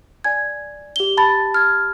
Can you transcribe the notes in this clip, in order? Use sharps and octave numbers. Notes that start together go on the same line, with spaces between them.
D5 G#5 G#6
G4 G7
A5 B5 A6
F6 G#6